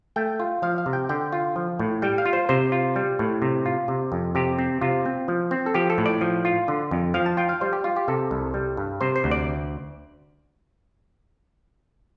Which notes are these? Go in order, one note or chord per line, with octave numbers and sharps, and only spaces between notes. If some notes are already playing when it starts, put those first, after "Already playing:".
A3 G5
F4
F3 F5
F5
C3
G5
D3 G5
F4
F3
A2
G3 G5
F5
F4
C5
C3 C5
F4
G3
A2
C3
F4
C3
F2
C3 G4
C4
C3 F4
C4
F3
C4
A4
F3 G4
A4
A2
D5
F3
F4
D3
F2
F3 F5
A5
F4 G5
F5
G3 C5
G4
F4
G4
C3 A4
C2
G3
G2
C3 C5
C5
D2
D5